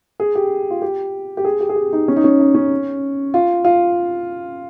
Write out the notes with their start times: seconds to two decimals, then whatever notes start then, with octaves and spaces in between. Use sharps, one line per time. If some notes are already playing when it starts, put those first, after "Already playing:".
0.20 G#4
0.35 G4
0.71 F4
0.82 G4
1.37 G4
1.45 G#4
1.60 G4
1.69 G#4
1.76 G4
1.93 D#4
2.08 C#4
2.16 D#4
2.24 C#4
2.40 D#4
2.55 C#4
3.34 F4
3.65 F4